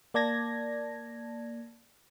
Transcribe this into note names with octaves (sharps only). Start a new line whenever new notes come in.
A#3 D5 A5 G#6 A#6